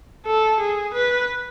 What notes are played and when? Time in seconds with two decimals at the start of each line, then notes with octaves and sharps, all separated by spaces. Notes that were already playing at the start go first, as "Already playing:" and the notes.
0.27 A4
0.60 G#4
0.94 B4